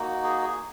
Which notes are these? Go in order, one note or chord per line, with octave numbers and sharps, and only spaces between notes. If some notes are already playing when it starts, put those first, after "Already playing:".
Already playing: A#3 D#4 F#4
G#4
G#4